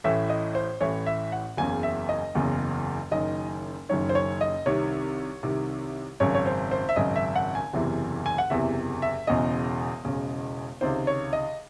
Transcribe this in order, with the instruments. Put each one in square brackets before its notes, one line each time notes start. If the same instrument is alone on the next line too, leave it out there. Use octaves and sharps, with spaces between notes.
[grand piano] A1 A2 E3 E5
D#5
C5
A1 A2 E3 C#5
E5
F#5
F#1 E2 C#3 G#5
E5
D#5
F#1 E2 C#3
F#1 F#2 D#3 D#5
F#1 F#2 D#3 C#5
C5
C#5
D#5
C2 C3 D#3 C#5
C2 C3 D#3
G#1 F#2 C#3 C#5
C#5
C5
C5
E5
G#1 F#2 C#3 D#5
E5
F#5
G#5
F#1 E2 C3 E3
G#5
F#5
F#1 E2 C3 E3 E5
E5
E1 E2 C#3 D#5
E1 E2 C#3
C#2 C3 D#3 C5
C#5
D#5